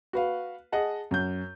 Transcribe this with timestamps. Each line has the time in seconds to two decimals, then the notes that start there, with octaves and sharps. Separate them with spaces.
0.13 F#4 B4 F5
0.72 G#4 D#5 F#5 A5
1.11 F#2 G6